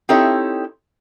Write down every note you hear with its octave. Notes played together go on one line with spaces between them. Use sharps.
C4 D#4 E4 G4 A4 C#5